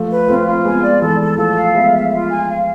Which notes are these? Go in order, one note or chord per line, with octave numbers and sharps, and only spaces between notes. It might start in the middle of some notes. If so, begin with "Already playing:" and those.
Already playing: F3 A3
B4
A3 C4 F4
F4
G#3 B3 G#5
D5
E3 G#3 A4
A4
F3 A3 A4
F5
G#3 B3 E5
E5
F4
G#5
F5